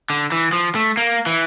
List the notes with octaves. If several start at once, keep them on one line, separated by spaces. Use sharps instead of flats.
D3
E3
F3
A3
A#3
E3